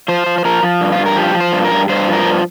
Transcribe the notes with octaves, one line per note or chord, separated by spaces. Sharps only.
F3 C5
F3
C5
F3 A#4
F3
G2
F4
G2
A#4
F3 G4
F3
C5
G2
A#4
G2
G2 C5
F3
A#4
G2